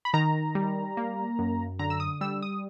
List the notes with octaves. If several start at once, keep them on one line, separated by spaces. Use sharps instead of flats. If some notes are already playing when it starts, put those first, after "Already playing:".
B5
D#3 A#5
G3
A#3
F#2
D3 A#5
E6
D#6
G3 E6
D#6